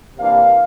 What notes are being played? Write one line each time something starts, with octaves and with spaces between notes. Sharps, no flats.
C3 E3 A#3 D4 F5